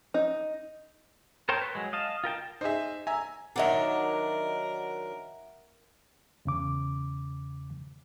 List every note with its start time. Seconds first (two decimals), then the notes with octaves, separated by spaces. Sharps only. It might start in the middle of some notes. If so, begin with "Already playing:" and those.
0.14 D#4
1.49 A#4 C5 C#5 G5 A5
1.61 B4
1.75 F#3 G#3
1.93 D#5 F5 A5
2.24 F4 A#4 G5 A5
2.61 D#4 G#4 C5 E5
3.07 E5 G#5 A#5
3.56 D#3 F#3 D4 A#4 E5 F#5
6.45 E2 C#3 D6